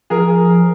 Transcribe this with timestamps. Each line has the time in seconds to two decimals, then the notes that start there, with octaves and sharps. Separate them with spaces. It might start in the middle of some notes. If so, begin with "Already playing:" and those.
0.10 F3 G#4 A#4